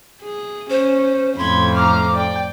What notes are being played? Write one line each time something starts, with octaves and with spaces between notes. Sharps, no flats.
G#4
C#4 C5
F2 A2 B5 C6 G#6
A#5 D6 F6
D5 G5